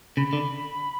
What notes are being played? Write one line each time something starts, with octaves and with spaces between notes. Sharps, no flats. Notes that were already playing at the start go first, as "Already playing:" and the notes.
C#3 B5
D3